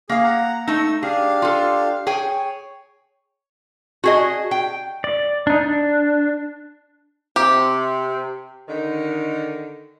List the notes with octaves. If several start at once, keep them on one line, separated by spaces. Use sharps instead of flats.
A#3 G#4 F5
F#5 A#5
A3 D#4 E6
D4 G4 G#4 F5
F4 A4
G#4 C#5 G5 G#5
F#4 G#4 D#5
G5
D5
D4 D#4
D4
C3 G4
D3 D#3